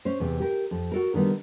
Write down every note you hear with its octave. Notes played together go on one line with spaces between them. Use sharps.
C#4 C5
E2 C3
G4 A#4
F2
F#4 A4 A#4
D3 D#3 G3 B3